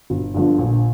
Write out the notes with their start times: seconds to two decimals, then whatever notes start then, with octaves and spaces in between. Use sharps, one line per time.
0.10 G1
0.34 G2 D3 F3
0.59 A#1